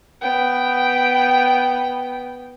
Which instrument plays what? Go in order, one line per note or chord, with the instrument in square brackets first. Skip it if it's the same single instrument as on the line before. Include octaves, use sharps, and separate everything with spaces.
[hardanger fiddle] B3 G5